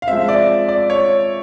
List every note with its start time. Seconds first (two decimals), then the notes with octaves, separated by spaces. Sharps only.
0.02 F5
0.08 F3 G#3 C4 E5
0.28 D5
0.68 D5
0.90 C#5